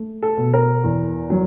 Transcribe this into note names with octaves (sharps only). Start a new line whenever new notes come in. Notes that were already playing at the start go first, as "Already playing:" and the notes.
Already playing: A3
A4
B2
A#4
E2
F#3